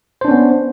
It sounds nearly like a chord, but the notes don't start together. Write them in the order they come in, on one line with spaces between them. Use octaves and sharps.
C5 D4 C#4 B3